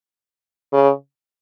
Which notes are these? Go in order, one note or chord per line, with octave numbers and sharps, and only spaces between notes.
C#3